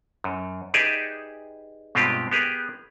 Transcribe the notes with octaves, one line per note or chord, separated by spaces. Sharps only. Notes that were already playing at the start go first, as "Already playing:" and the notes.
F#2
D#4 G4 G#4 B4 D5 E5
G2 B2 G#3 C4 F4 G4
B3 G4 G#4 A#4